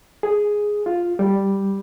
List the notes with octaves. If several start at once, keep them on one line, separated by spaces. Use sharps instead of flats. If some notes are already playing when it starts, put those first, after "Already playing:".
G#4
F4
G3